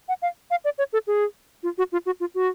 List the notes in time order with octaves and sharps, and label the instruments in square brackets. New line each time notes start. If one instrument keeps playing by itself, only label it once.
[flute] F#5
F5
F5
D5
C#5
A4
G#4
F4
F#4
F4
F#4
F4
F#4